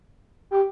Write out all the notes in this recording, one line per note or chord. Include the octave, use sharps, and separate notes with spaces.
G4